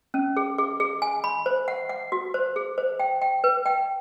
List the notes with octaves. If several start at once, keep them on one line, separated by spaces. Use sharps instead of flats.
C#4
G#4
G#4
G#4
G#5
B5
C5
F#5
F#5
F#4
C5
G#4
C5
G5
G5
B4
G5